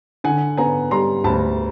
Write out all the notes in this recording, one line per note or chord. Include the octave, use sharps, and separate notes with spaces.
D3 F#5 G#5
B3 G#5 A#5
G3 A#5 C6
D2 A5 B5